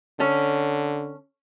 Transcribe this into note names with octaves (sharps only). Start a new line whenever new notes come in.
D3 C#4 A4